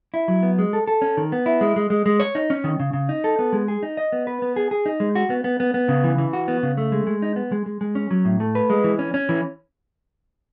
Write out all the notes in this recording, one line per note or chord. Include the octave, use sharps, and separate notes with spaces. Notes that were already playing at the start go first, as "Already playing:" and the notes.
E4
F#3
B3
G#3
A4
A4
C#4
D#3
B3
E4
G#3
G#3
G#3
G#3
C#5
D#4
C#4
D#3
C#3
C#3
D#4
A4
B3
G#3
G#4
D#4
D#5
B3
B4
B3
G#4
G#4
D#4
G#3
F#4
B3
B3
B3
B3
C#3
E3
E3
F#4
B3
C#3
A3
G#3
G#3
D#4
B3
G#3
G#3
G#3
C#4
F#3
A2
A3
B4
G#3
E3
C#4
C#4
E3